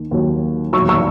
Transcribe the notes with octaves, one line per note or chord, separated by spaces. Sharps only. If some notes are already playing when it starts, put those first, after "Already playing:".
Already playing: D#2 D#3
D#2 D#3 F#3
E1 D#2 D#3 F#3 C#6 E6
C#6 E6